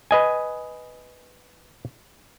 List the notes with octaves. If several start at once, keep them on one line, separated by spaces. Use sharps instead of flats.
B4 D#5 G#5